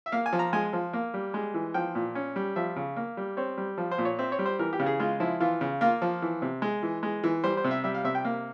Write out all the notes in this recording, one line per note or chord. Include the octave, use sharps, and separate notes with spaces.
E5
A#3 F5
G#5
F3
A#5
G#3 G#5
F3
A#3
G3
G#3
E3
F3 G5
A#2
C#4
G3
F3 E5
C#3
A#3
G3
C4 C#5
G3
F3
C5
A#2
C#5
C4 E5
C#5
G3
C5
E3 A#4
G4
C#3
G#4
G#3 F4
F3 E4
E3 F4
C#3
A#3 F4
F3
E3
C3
G#3
E3
G#3
E3
G3 C5
C5
C3
E5
G3 E5
F5
C3 E5
G5
A#3